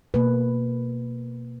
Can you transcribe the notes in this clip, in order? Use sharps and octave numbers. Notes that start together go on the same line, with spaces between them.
B2 A#3 B4